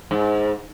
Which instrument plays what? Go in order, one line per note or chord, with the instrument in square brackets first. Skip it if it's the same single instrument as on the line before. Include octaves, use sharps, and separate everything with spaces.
[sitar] G#2